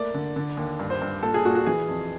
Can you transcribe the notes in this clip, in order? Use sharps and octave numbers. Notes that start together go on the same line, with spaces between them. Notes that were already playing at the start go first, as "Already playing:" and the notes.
Already playing: A3 A#3 D5
D3
D3
D#2
G2
C5
G2
A#2 A4
G#4
A#2 F#4
F#4
E3 G#4
F2